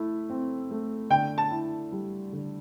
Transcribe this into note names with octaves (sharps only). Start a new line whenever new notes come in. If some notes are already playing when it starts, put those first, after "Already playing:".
Already playing: A3 E4
C4
A3
D3 G5
A5
E4
G3
D3